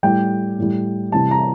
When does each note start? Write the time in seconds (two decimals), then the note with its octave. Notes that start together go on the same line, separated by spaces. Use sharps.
0.03 A2 G3 G5
0.58 A2 G3
1.12 C3 E3 G3 A5
1.31 A#5